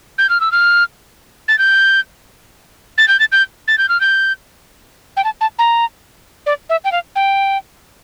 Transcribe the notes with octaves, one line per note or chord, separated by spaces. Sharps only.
G6
F6
E6
F6
A6
G6
A6
G6
A6
G6
A6
G6
F6
G6
G5
A5
A5
A#5
D5
E5
G5
F5
G5